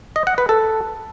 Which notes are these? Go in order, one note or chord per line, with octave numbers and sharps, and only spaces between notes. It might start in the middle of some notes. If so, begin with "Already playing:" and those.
D#5
F#5
B4
A4